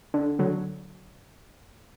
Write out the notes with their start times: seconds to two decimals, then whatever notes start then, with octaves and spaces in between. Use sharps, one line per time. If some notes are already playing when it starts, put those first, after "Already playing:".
0.14 D3
0.39 D3 F#3